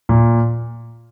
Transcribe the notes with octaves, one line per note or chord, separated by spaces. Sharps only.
A#2